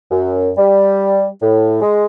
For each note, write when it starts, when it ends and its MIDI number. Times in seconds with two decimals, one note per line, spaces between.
0.11 0.49 42
0.57 1.27 55
1.42 1.79 45
1.82 2.06 56